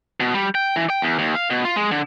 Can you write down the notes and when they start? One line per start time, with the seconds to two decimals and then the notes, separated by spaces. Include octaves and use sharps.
0.20 B2
0.34 G3
0.55 G5
0.76 E3
0.90 G5
1.02 E2
1.19 D#2
1.35 F5
1.50 B2
1.65 F4
1.76 G#3
1.91 D3